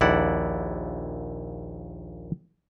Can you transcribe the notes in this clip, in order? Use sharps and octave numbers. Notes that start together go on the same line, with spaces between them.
A#1 D#2 E4 D5 F#5